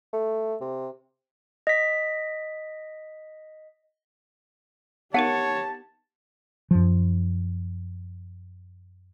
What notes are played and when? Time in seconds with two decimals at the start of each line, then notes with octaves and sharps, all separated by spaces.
0.13 A3
0.61 C3
1.67 D#5 B6
5.14 B3 D#4 G4 A#4 C#5 F#5 A5
6.71 F#2 F3